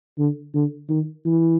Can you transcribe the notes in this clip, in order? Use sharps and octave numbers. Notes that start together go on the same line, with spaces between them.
D3
D3
D#3
E3